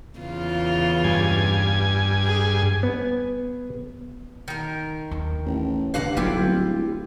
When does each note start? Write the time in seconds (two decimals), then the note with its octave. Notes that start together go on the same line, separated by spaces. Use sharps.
0.19 E2 C#3 F4
1.04 G2 G#5
2.25 G#4
2.83 B3
4.48 D#3 A#4
5.11 D#2
5.46 A1
5.94 G2 D3 F5 F#5 A#5
6.17 B1 F#3 G3 E4 F4 G4
6.41 D1